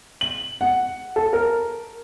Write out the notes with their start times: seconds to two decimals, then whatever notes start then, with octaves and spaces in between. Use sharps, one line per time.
0.21 F#7
0.61 F#5
1.16 A4
1.33 A#4